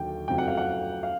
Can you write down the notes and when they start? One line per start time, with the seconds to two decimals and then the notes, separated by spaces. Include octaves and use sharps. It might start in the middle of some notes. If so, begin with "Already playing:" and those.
Already playing: D#2 D3 F#3 G5
0.28 F#1 F2 C#3 F#3 A3 G5
0.38 F#5
0.48 F5
0.57 F#5
1.03 F5